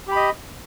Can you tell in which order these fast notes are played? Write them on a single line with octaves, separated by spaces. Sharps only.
G4 B5 D#5